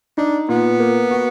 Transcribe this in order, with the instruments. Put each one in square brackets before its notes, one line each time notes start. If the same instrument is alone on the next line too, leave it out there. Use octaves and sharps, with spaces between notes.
[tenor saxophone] D4 [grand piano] D#4
[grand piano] A#2 [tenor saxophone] B3
[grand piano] A#3
F#4